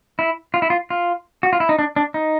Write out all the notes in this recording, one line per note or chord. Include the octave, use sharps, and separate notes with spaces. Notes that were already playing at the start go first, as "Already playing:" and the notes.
E4
F4
E4
F4
F4
F#4
F4
E4
D#4
D4
D4
D#4